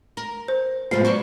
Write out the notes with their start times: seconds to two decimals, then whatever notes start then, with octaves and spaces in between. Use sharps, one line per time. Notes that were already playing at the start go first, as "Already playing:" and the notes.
0.17 A#4
0.48 C5
0.91 A2 C3 F3 G#3 B3 F4 C5 C7
1.05 F#3 D4 B4 C#6